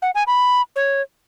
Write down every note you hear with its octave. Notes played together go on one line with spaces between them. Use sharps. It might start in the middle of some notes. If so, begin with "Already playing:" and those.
F#5
G#5
B5
C#5